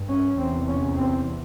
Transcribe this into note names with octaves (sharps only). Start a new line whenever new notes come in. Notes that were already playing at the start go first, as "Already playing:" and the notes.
Already playing: G2
C#4
E2 C3 C4
C#4
C4